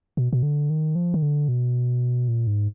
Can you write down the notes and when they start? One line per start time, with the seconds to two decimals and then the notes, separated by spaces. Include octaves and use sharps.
0.17 B2
0.33 B2
0.43 D3
0.70 D#3
0.95 F3
1.14 D#3
1.22 D3
1.48 B2
2.28 A#2
2.47 G#2